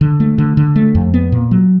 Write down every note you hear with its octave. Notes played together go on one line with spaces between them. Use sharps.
D3
A3
D3
D3
A3
F2
B3
A#2
F#3